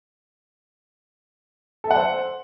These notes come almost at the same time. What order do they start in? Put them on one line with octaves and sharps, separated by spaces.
A4 E5 F#5 D5 C5